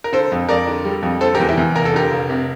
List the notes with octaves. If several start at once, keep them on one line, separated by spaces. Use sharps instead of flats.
A#4
D3 A4 C5
F2
F2 A#4 D5
D3
G3
F2
D3 A4 C5
G4 A#4
E2
E4 G4
E2
F1 A#4
A4
D3 G4 A#4
F1
C3